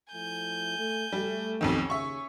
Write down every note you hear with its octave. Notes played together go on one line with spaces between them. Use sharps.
F3 A3 E4 G#5 G6
A3
G3 A3
B1 F2 D#3 C#4
D#2 C#3 E5 C#6